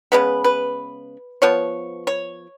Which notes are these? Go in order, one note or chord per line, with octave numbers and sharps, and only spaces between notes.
C#3 G#3 B3 B4
B4
F3 B3 C#5
C#5